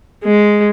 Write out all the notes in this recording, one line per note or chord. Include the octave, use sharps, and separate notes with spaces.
G#3